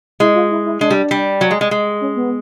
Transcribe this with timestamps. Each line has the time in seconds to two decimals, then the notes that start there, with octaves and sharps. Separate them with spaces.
0.20 G#3 E4
0.35 F4
0.51 E4
0.66 E4
0.81 G#3 D4
0.90 G3
1.11 G3
1.41 F#3
1.51 G#3
1.61 G#3
1.71 G#3
2.01 C#4
2.16 B3